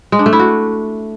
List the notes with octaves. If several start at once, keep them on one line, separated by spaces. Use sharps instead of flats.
G#3
D4
A3
E4
F#4